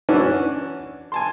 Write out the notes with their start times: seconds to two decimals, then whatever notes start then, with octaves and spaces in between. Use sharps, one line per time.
0.09 E3 C#4 D4 F#4
1.12 G#5 A5 C6